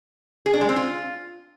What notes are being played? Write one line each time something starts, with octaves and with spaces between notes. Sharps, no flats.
G#4
D4
G#3
C4
F4